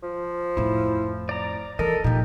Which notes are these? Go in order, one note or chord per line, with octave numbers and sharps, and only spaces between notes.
F3
F2 A2 E4
D5 A#5
E3 A4 A#4 D#5
A#2 F3 A#3 D#4 G4